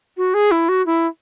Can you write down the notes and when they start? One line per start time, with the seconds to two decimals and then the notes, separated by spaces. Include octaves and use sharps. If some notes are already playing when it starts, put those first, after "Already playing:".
0.17 F#4
0.34 G#4
0.51 E4
0.69 F#4
0.86 E4